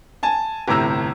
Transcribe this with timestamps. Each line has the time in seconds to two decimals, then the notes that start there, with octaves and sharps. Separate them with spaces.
0.23 G#5 A5
0.68 G1 A2 C3 A#5 E6